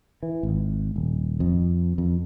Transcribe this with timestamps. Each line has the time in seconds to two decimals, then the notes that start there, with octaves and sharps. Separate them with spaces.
0.23 E3
0.43 G#1
0.96 D#1
1.40 F2
1.98 F2